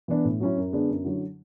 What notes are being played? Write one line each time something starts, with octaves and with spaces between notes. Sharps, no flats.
E3 B3 D4
A2
F#3 C#4 E4
F#2
D3 G#3 B3 D4
F#2
D3 F#3 C#4 E4